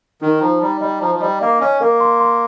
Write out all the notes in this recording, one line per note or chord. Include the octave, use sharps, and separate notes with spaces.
D#3 D#4
F3 A#5
G3 A#5
G3 D#5
F3 A#5
F3
G3 D#5
A#3 D#5
C#4 D#5
A#3 A#4
C6
C6